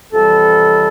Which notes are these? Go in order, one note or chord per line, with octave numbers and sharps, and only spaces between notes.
F2 C3 E3 G3 A4